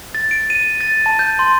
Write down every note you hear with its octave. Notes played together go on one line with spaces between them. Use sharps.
A6
D7
D#7
A6
A5
G6
C6